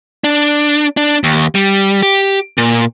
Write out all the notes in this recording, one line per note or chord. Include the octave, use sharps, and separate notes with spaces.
D4
D4
D#2
G3
G4
A#2